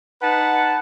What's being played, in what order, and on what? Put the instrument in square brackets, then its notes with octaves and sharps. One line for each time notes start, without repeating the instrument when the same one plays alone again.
[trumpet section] D#4 B4 F#5 A5